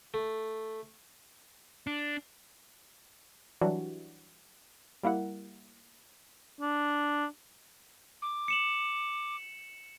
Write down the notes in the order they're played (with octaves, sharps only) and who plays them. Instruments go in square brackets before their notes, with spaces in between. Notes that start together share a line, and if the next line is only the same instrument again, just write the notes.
[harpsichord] A3
[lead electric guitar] D4
[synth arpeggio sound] E3 F#3 G3 D4 F#4
G3 A#3 E4 F#5
[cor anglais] D4
[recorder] D6
[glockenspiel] C#7 E7 F#7